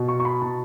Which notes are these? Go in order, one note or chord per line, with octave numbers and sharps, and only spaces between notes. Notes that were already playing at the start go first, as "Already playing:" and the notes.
Already playing: B2
C#6
C#6
B5
B2 A5